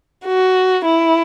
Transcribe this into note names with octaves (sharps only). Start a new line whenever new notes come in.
F#4
E4